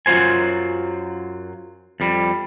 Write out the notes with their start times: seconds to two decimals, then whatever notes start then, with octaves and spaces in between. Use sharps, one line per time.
0.06 F#2 F#3 F4 C5 G#5
2.00 F2 G3